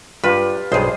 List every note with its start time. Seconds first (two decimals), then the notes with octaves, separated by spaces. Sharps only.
0.24 G2 F4 G4 B4
0.72 B1 G2 G#4 C5 D#5